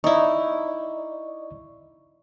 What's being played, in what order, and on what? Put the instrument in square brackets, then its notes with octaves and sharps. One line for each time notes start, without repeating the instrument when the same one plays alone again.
[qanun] D#4 E4 [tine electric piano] D5 D#5 C#6